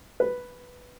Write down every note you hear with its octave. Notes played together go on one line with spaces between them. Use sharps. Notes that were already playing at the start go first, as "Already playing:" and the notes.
B4